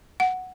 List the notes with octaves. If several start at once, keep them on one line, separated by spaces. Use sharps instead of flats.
F#5